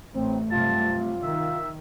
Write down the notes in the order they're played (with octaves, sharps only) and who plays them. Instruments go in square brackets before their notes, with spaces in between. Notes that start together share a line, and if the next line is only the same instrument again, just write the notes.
[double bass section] A1 [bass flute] A3 [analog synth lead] C4
[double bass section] G2 C3 F#3 [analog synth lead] F4 [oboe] A5
[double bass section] D#3 [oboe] E5